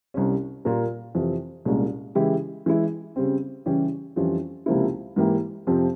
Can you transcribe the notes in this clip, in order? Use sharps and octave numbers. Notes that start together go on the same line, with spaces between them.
C2 C3 G3 C#4
A#2 G3 A#3 F4 A#4
F2 C3 E3
C2 A#2 G#3 C#4
C#3 E3 G#3 E4 G4
E3 G#3 E4
C#3 G3 C4
C#3 E3 G3 C#4 G4
F2 E3 G3 C#4 F4
C#2 C3 F3 A#3 E4
G#2 E3 A#3 E4 G4
F2 C3 F3 C4